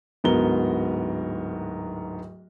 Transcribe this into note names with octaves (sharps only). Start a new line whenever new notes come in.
D1 G#2 B3 F#4 A#4 G7